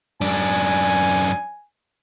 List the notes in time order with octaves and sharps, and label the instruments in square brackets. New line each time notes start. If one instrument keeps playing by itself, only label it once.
[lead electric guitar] F#2 D4 [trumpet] G#5